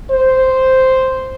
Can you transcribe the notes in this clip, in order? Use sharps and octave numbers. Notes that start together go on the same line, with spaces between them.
C5